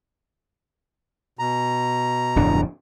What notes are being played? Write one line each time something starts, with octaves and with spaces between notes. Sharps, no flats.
B2 A#5
D1 F2 D4